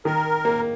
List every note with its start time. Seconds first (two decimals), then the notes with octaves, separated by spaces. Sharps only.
0.05 D#3 A#4
0.45 A#3